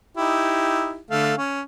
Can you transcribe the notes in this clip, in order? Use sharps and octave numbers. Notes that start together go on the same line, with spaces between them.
D#4 E4 G4
D3 A3 F5
C#4